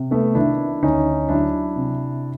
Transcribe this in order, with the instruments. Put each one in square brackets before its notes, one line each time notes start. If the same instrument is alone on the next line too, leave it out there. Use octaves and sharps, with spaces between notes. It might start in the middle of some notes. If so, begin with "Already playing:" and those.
Already playing: [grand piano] C3
A3 B3
D#3 D4 E4
D2 C#4 D#4
F#3 D4 E4
C3